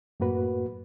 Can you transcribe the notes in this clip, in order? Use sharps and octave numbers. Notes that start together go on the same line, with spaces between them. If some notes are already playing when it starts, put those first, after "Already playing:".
F#2 A2 A#3 F#4 B4